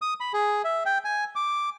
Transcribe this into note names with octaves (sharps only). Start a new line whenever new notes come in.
D#6
B5
G#4
E5
G5
G#5
D6